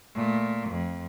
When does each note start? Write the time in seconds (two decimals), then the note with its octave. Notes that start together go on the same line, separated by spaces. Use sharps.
0.15 A#2 A3
0.70 F2